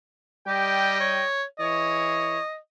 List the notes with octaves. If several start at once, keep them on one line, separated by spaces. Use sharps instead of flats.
G3 G4 D#5 G5
C#5
E3 G#4 C#5 D#5